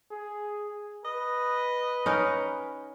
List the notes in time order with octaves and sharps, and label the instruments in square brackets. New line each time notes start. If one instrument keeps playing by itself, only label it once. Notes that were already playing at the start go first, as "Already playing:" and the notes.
[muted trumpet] G#4
[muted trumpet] B4 [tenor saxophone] D#5
[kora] C#4 D#4 A#4